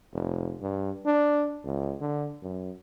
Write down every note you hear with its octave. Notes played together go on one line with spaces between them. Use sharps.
F1
G2
D4
C#2
D3
F#2